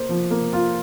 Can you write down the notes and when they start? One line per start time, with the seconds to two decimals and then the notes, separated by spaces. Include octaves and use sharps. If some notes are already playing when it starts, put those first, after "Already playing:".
Already playing: A#3 C5
0.09 F3
0.31 A#3
0.53 F4